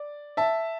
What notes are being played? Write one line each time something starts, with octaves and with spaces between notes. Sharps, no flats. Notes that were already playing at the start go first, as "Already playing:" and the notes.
Already playing: D5
E5 A5